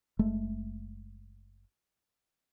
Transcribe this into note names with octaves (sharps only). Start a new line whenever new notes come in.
F#1 G#3 A3